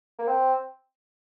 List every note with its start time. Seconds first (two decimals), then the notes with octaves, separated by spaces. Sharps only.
0.19 A#3
0.28 C4